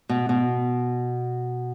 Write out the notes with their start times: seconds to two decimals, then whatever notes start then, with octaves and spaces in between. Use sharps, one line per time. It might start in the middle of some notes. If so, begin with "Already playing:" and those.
0.09 B2
0.29 B2